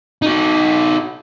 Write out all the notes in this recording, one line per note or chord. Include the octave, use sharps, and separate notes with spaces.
D#4 F#4